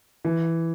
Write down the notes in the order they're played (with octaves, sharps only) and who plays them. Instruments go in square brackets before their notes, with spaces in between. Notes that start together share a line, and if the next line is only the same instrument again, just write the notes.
[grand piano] E3